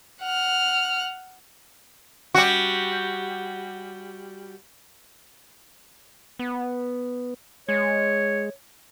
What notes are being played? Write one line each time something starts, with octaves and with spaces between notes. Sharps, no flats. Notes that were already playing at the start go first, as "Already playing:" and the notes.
F#5 F6
G3 F#4
B3
G#3 C#5